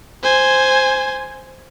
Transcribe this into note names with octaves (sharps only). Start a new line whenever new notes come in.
C5 G#5